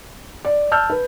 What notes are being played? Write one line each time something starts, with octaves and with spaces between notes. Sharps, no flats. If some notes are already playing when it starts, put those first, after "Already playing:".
D5
A5 E6 F6 G6
B4